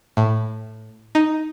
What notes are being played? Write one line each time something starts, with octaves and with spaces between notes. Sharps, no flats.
A2
D#4